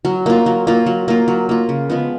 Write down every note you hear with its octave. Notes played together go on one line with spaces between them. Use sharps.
F#3
A#3 F4
F#3
A#3 F4
F#3
A#3 F4
F#3
A#3 F4
C#3
F3 G#3 B3